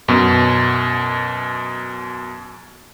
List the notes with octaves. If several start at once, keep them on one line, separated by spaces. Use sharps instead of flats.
F#2 B2